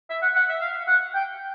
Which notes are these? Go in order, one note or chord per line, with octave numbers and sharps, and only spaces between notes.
E5
F#5
F#5
E5
F5
F#5
G5